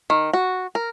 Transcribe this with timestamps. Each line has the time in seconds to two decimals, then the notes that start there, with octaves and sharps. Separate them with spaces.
0.10 D#3
0.33 F#4
0.75 A#4